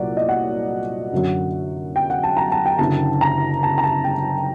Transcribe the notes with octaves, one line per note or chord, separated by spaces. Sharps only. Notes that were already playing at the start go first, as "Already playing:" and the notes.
Already playing: C2 A#2 F#3 D5 F#5
D#5
F#5
F#2 D3 F#3
G5
F#5
A5
A#5
A5
G5
F#1 F#2 D3 A5
A#5
A5
A#5
A5
G5